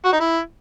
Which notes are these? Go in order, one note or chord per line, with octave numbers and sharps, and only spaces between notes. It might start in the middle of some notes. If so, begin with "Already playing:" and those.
F#4
D#4
E4